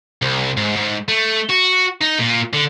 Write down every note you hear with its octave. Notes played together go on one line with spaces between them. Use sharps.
C2
G#2
G#2
A3
F#4
D#4
A#2
D3